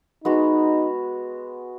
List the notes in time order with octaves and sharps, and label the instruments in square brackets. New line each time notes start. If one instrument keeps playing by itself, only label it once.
[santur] G#3 B3 F#4 [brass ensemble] D#4